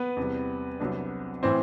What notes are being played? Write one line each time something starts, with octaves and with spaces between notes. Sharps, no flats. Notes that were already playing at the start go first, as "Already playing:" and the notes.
Already playing: B3 B4
E2 C3 G3
C2 C3 F#3 B3 D4
A2 E3 C4 C5